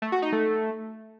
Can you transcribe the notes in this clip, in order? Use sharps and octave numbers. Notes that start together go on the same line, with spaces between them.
A3
F#4
D#4
A3